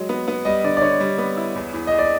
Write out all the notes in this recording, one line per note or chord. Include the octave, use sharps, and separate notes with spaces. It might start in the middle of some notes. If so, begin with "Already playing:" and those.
Already playing: F#3 G#3 D#5
B3
B3
G3 D#5
D3 D5
D5
D3 C#5
G3
B3
E4
E2
E2
E2 D#5
D5